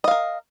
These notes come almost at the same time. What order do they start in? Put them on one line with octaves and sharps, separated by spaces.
D#5 F5 A#4